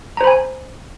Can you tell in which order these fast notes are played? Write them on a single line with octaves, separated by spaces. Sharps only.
A#5 C5 B5 G#5